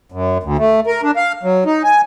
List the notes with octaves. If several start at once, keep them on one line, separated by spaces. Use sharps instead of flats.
F#2
D2
A3
A#4
D4
F5
F#3
D#4
G#5